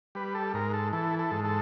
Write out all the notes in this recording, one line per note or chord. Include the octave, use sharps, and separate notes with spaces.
G3 B4
A4
G#2 A#4
A4
E3 A4
A4
G#2
A4